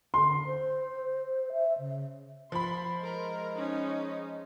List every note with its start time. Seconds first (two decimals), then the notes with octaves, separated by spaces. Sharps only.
0.14 D3 C6
0.46 C5
1.52 E5
1.78 C#3
2.52 F3 B5 C6
3.03 G#3 A#4
3.57 C#4 D#4